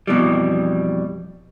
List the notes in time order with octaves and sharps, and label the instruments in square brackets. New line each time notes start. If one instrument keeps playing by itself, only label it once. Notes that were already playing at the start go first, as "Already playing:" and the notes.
[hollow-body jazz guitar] F2 B2 E3 G3